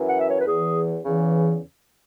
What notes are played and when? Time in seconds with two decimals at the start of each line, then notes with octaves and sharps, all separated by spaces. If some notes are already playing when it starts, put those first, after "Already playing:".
Already playing: F#2 E3
0.08 F#5
0.18 E5
0.28 C#5
0.37 B4
0.46 E2 E3 G#4
1.03 E2 C#3 E3